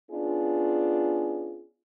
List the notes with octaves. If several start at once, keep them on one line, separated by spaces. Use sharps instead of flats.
B3 C#4 D4 F4 G#4